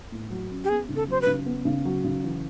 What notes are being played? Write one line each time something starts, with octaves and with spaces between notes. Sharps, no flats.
A2
F#3
C#4
G4
B3 G#4
C#3
A4
F#3 C5
B4
C#3
B3
C#3
F#3
C#3
E3